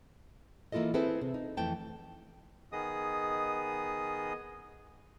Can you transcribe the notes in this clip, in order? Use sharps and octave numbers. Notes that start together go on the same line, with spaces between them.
E3 A#3 E4 F4 A4 D#5
C4 E4 G#4 A4 B4 C5
C3
D#4
F2 E3 A3 G5 A5
D#3 B3 G#4 D#5 D#6